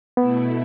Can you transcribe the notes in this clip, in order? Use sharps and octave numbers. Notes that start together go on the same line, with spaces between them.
B2 A3 B3 E4